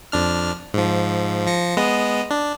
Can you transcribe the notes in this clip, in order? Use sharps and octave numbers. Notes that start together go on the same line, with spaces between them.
F2 D4 F6
G#2 F3
F3 A#6 C#7
G#3 B3 D#5
D4